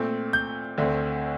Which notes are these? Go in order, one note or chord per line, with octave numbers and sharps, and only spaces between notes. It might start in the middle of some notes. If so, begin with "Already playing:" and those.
Already playing: A#2 A3 C4
G6
D2 D3 A3 C4